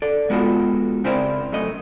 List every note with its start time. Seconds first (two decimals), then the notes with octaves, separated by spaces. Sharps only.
0.02 A4 D5
0.30 G#3 B3 F4 F#4 A4
1.04 C#3 C4 E4 A#4 C5 D5
1.52 F#2 A3 D#5